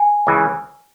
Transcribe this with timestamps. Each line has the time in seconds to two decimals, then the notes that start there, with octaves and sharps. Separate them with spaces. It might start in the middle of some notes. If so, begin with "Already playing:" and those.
Already playing: G#5
0.27 C#2 C#3 E3